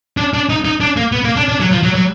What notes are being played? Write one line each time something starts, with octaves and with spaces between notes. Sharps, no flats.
D4
D4
D#4
D#4
D4
A#3
B3
A#3
D4
D4
F#3
F3
F#3
F#3